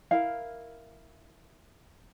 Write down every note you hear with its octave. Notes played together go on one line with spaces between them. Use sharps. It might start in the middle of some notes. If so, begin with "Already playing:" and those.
E4 A#4 F5